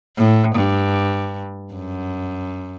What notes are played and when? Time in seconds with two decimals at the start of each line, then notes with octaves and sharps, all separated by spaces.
0.17 A2
0.56 G2
1.74 F#2